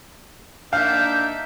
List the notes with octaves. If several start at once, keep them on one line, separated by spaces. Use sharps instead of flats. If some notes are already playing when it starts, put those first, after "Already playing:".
A#3 D4 D#4 E5 F5 G6